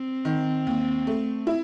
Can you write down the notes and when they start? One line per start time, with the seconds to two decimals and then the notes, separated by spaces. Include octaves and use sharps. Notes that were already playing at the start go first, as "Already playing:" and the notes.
Already playing: C4
0.25 D#3
0.67 D#2
1.07 A3
1.47 E4